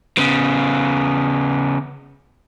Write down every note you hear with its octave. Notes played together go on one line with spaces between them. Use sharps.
C#3 B3